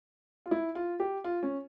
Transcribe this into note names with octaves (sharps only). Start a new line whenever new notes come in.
F4
E4
F4
G4
F4
C#4